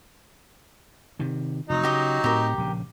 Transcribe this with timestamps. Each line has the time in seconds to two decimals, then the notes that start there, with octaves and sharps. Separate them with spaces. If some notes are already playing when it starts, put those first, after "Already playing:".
1.19 C3 D#3
1.70 F1 F#3 D#4
1.84 C#3 G4 D#5 D#6
2.24 A2 C4 G4 A#4
2.58 A#1 C#3